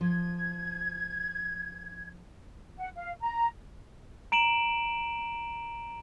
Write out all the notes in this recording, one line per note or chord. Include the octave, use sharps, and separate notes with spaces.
F3 G#6
F#5
F5
A#5
A#5 D7 E7 F#7